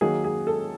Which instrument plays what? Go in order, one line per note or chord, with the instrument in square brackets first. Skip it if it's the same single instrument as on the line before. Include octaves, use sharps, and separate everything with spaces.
[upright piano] D#3 F#3 A#3 G#4
G#4
A4